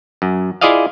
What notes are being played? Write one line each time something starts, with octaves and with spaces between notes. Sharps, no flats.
F#2
E4 F4 G#4 D5 D#5 F5